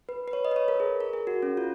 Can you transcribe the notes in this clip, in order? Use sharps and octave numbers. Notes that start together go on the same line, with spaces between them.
B4
B4
C#5
D#5
B4
C#5
A#4
G#4
A#4
G#4
F#4
C#4
F4